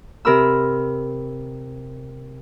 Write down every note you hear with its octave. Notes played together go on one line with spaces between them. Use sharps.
C3 A#4 B5 E6